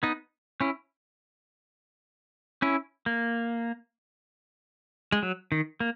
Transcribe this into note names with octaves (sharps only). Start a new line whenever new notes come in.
B3 D#4
C#4 E4
C#4 E4
A#3
G#3
F#3
D#3
A#3